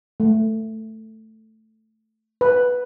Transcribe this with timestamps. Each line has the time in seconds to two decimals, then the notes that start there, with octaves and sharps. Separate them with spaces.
0.20 A3
2.41 B4